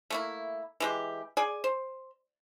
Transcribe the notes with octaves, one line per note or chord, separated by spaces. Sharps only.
A3 A#3 E4
E3 G#3 G4
G#4 D5 G#5
C5